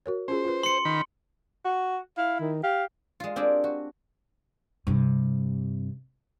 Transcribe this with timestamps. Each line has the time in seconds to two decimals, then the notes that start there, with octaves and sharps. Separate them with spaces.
0.06 F#4 A#4 C#5
0.28 C#4 F4 G#4 C5
0.45 F4 B4
0.63 C6 C#7
0.85 D#3 B5
1.65 F#4
2.18 E4 F5
2.40 D#3
2.63 G4 F5
3.20 G#3 F4
3.36 C4 D4 G4 G#4 A#4
3.64 F#4
4.87 G2 C3